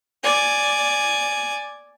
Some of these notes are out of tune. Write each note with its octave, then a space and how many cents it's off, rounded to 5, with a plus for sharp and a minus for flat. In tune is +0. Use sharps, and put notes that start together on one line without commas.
D5 +0 G#5 +0